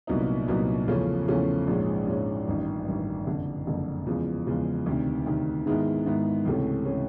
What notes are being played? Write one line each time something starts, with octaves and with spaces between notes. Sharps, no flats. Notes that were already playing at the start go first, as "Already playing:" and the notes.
C2 A#2 F#3 B3 D#4
C2 A#2 F#3 B3 D#4
E2 C#3 F3 A3 C#4
E2 C#3 F3 A3 C#4
A#1 G#2 F3 G#3 C#4
A#1 G#2 F3 G#3 C#4
A1 G2 D#3
A1 G2 D#3
F#1 F2 D3
F#1 F2 D3
E2 C#3 F3 G#3
E2 C#3 F3 G#3
D2 C3 D#3
D2 C3 D#3
G#2 D#3 G#3 B3 E4
G#2 D#3 G#3 B3 E4
C#2 C3 E3 A3 C#4
C3 E3 A3 C#4